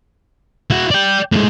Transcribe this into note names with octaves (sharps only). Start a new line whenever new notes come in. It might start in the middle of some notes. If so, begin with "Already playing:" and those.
E4 F#4
D5 G5
A2 G#3